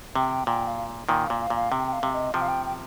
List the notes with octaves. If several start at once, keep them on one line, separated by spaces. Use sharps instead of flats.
C3 G5
A#2 G5
F5
A#2 D#3 G5
F5
A#2
F5
A#2
F5
C3 G5
G5
F5
C3
D#5
C3 F3 G5
F5
G5
G5